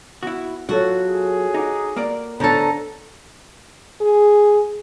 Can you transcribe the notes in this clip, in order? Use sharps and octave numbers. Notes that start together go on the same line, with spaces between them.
B3 E4 F#4
F#3 F4 F#4 A4 C#5
G#4
D#4 F#5 D6 A#6
A#3 A#4 D5
D3 B3 A4 C5 C#5 A#5
G#4